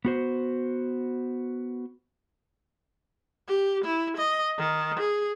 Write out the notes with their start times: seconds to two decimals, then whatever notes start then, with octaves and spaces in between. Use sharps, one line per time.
0.05 B3 F#4 C5
3.48 G4
3.85 E4
4.17 D#5
4.58 D#3
4.99 G#4